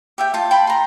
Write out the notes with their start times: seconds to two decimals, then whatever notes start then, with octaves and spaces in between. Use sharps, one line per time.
0.18 G4 E5 G5
0.34 F4 A5
0.51 G5 A5 B5 C6
0.67 A#5 C6